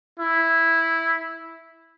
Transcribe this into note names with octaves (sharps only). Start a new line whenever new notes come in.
E4